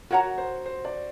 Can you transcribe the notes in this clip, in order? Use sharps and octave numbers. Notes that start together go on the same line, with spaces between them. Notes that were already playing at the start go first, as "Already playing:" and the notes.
F#4 A#4 C#5 F#5 A#5
C5
C5
D5